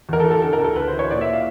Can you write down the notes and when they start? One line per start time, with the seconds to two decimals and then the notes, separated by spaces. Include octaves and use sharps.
0.09 E2 A#4
0.20 A4
0.25 E3
0.31 A4
0.42 D3 A4
0.53 A#4
0.59 D2
0.64 A4
0.75 D2 B4
0.88 E3 C5
0.99 C#5
1.10 A#2 D5
1.21 E5
1.33 F5